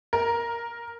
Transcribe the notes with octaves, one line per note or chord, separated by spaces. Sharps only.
A#4